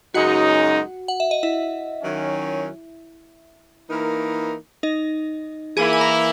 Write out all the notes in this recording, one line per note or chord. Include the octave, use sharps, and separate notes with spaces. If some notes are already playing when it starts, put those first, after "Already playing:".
F#2 C#3 G#3 D#4 F#4 F#5
F#5
E5
D#5
E4 E5
D#3 F#3 C#4
E3 A#3 D#4 A#4
D#4 D#5
E3 A#3 E4 G#4 G#5
G#5
A#4 A#5